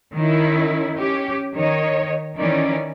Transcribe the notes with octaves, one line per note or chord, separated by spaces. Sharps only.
D#3 C#4 E4
C#4 G4
D#3 C#5 D#5
D#3 E3 C#4 D5